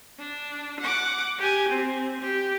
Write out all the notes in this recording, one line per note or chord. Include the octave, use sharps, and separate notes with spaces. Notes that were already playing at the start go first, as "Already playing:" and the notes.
D4
F#5 D6
G4 G#5
C4
G4